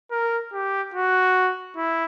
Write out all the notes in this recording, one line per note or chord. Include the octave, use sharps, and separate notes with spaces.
A#4
G4
F#4
E4